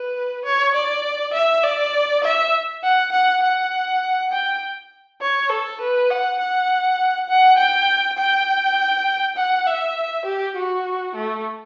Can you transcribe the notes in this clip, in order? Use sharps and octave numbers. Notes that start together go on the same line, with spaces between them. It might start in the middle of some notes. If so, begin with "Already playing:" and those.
Already playing: B4
C#5
D5
E5
D5
E5
F#5
F#5
F#5
G5
C#5
A4
B4
F#5
F#5
F#5
G5
G5
F#5
E5
G4
F#4
A3